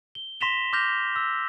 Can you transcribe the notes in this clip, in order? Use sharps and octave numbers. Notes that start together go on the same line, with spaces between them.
G7
C6 A#6 B6 E7 F7 G7
C6 D6 F6 G6 A#6 F7
E6